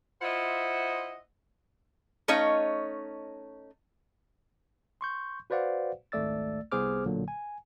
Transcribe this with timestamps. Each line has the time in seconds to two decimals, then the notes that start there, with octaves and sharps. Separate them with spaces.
0.22 E4 F4 C5 D#5 E5 F#5
2.28 A3 C#4 D#4 C#5 D#5 F5
5.01 C6 C#6 G6
5.50 F#4 B4 C5 D5 F5 F#5
6.12 G#1 C#2 A3 D5 E6 A6
6.72 C2 B3 G#4 C5 D6 F6
7.05 B1 A#2 D3 F#3 A#3
7.28 G#5